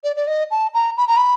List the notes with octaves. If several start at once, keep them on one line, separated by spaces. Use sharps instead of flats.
D5
D5
D#5
A5
A#5
B5
A#5
B5